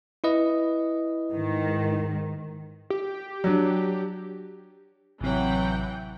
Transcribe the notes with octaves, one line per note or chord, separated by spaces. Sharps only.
E4 B4 D#5
G#2 D#3
G4
F#3 D4
A1 C3 E3 F#3 F#5 G5